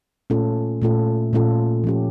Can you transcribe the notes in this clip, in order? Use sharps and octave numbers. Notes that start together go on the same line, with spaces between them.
A#2 A3 C#4 F4 A4
A#2 A3 C#4 F4 A4
A#2 A3 C#4 F4 A4
F3 C#4 G4